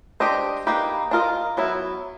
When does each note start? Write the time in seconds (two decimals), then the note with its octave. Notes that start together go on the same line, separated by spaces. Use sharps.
0.20 D4 G4 C5 D#5
0.67 A#3 D#4 G4 B4
1.11 D4 F4 A#4 D#5
1.57 F#3 B3 E4